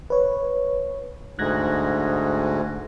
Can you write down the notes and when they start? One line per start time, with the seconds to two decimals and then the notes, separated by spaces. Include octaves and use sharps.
0.10 B4 C#5
1.39 D2 G#2 F#6 G#6 A#6